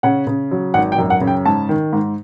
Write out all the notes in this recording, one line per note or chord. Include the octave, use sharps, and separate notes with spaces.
C#3 F#5
C#3
F#3
G#1 F#5
G5
F#2
F#5
C#3
G5
G#2 A5
D#3
G#2